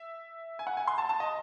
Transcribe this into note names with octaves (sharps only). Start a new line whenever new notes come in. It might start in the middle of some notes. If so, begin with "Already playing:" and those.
Already playing: E5
G#5
F#5
G#5
C6
A5
A5
D#5